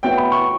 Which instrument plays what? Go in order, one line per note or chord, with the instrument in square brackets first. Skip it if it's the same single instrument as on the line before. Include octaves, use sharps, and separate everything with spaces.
[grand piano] B3 F#4 C#5 E5 [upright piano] G5
[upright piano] B5
C#6